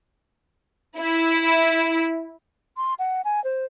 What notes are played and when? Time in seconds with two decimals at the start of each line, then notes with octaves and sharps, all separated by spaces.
0.98 E4
2.77 C6
2.99 F#5
3.25 G#5
3.44 C5